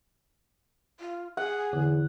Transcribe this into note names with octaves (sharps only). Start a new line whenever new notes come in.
F4
G#4 F#5
E2 D3